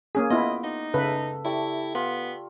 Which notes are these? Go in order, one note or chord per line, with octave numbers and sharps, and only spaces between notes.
A#3 C#4 G#4
B3 E4 F4 D#5 D6
D#4 F#5
C#3 A4 B4 E5
A3 E4 G4 D5
B3 F4